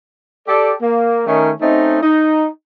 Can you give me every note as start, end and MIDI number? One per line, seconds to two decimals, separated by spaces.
0.48 0.72 67
0.48 0.72 69
0.48 0.72 74
0.81 1.22 58
1.26 1.51 51
1.26 1.51 57
1.26 1.51 61
1.61 2.00 57
1.61 2.00 60
1.61 2.00 61
1.61 2.00 63
2.02 2.47 63